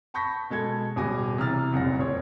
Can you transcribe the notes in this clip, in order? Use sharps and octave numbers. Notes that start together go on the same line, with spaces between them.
A5 B5 C#6 G6 A#6 B6
B2 G#3 A4 G#6
D1 B2 G3 G#5 D6 A#6
C3 E3 A#5 F6 A6
F1 C2 F#2 A#2 A#6
D#1 C5 C#5